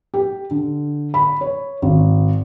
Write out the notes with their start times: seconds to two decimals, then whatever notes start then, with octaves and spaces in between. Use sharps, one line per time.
0.14 G4
0.51 D3
1.14 B5
1.41 C#5
1.82 G#1